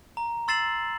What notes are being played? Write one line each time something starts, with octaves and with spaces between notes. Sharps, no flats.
A#5
C6 E6 A6 C7 E7 F#7